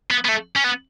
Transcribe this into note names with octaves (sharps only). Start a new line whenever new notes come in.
B3
B3
A3
C#4
B3